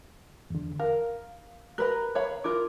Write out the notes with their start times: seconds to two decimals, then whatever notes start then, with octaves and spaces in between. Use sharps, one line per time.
0.50 E2 D3
0.80 A#4 F5
1.78 A#4 B4 A#5 F#6
2.15 C#5 F5 B5
2.44 E4 F4 A#4 D6